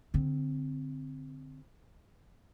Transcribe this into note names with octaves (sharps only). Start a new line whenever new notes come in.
D3 C4